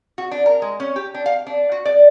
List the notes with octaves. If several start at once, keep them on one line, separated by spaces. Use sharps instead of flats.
F#4
D4
A#4
G#3
C#4
G4
D4
F5
D4
F#4
D5